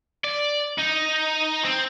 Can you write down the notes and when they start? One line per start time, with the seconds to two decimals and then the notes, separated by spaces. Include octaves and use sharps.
0.24 D5
0.79 D#4
1.65 C4